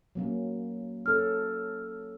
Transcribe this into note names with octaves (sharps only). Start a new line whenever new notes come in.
F#3 A#3 C#4
C#4 A4 F6